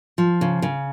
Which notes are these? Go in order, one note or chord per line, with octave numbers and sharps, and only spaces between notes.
F3
C#3
C#3